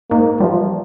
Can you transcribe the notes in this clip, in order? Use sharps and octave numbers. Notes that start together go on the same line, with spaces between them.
G#2 A#3
E3 F3 G3